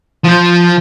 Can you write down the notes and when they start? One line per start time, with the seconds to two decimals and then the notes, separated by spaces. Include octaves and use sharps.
0.25 F3 C5